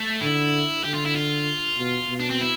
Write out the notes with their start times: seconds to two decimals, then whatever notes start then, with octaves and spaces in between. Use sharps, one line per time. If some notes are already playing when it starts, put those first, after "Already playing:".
Already playing: A3
0.21 D3 E4
0.84 D3 G4
0.94 F4
1.05 E4
1.16 F4
1.77 B2
2.09 B2
2.20 D4
2.30 C4
2.41 E4